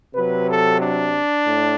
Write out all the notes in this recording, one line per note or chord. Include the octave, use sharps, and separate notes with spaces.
C3 F#3 B4
A4
D4
A2